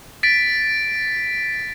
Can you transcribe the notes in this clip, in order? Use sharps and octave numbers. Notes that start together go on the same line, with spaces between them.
A6 B6 D7